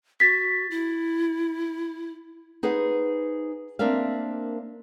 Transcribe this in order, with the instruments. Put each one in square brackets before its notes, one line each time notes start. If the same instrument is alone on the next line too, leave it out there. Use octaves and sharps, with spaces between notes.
[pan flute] F#4 [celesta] A6 B6
[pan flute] E4
[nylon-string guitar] D#4 G#4 B4 C5 F#5
A#3 C4 D4 A#4 E5 F5